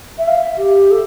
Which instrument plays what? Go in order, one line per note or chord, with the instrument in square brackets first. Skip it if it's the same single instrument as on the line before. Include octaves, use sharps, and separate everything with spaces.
[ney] E5
F5
E5
G4
A4